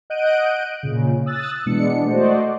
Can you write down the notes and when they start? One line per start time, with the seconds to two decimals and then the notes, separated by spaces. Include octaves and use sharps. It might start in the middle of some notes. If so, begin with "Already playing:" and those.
0.10 D#5 F#5 F#6 G6 D7 D#7
0.83 A#2 C#3
1.26 D#6 E6 F#6 A6
1.66 B2 E3 G#3 B3 D4 C#7
2.06 A3 F#4 C5 D5 D#5